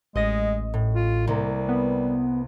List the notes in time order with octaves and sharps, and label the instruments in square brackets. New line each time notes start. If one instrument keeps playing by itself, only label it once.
[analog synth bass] A1 [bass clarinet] G#3 [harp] D#5 A#6
[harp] A2
[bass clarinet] F4
[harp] C2 A#3 [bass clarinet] G3
[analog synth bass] B3